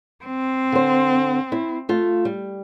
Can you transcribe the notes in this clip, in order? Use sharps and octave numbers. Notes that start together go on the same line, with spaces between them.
C4
D3 C5
E4
A3 F4
G3